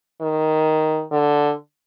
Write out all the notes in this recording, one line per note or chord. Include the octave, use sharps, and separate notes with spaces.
D#3
D3